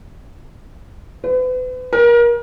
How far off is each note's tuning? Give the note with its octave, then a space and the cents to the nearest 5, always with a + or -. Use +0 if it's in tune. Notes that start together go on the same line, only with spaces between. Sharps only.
B4 +40
A#4 +30